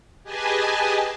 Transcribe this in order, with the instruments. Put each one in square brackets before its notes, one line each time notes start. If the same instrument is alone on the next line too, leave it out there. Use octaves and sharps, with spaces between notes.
[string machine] G4 G#4 B4 D#5 G#5 A5